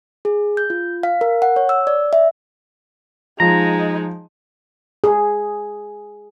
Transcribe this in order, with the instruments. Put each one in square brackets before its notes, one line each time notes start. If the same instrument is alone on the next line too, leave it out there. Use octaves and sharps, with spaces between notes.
[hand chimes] G#4
G6
F4
F5
A#4
F#5
C#5
E6
D5
E5
[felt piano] F3 [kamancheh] G#3 D#4 [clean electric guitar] A#5
[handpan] G#4